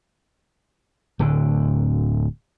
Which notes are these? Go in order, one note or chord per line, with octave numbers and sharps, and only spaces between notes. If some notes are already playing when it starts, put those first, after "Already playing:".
D1 D2 D3